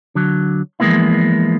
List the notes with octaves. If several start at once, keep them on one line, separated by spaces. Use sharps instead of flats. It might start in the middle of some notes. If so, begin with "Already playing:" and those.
D3 F#3
E3 F3 G#3 A#3 B3 E4